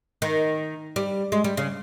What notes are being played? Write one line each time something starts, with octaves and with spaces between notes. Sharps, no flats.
D#3
G3
G#3
G3
C#3